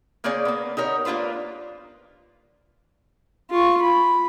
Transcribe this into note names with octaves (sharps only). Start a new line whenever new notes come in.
C#3 A#3 C4 G#4 C#5 D5
A#3 B3
D#4 G4 A#4 C#5
A#3 D4 F4 B4 C5
F4 C#6
B5